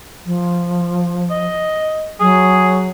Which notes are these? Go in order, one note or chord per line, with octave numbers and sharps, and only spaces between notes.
F3
D#5
F#3 G#4